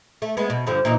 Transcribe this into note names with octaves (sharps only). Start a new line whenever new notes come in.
A3
G#3 B3
B2
G2 D3 F3
A#2 E3 D#4